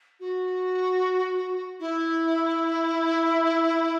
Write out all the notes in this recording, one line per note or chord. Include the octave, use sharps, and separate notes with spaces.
F#4
E4